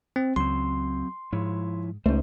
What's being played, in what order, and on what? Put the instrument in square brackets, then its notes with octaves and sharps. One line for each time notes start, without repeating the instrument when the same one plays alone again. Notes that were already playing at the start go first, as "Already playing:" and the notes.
[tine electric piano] C4
[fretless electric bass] C#2 [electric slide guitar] F#3 C4 [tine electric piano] C6
[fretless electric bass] G#2 [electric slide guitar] F3 E4 C#5
[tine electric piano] C#2 [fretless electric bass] A3 C#4 [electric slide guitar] D#4 C5